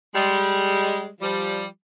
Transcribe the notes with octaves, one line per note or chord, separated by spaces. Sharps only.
G3 G#3
F3 G3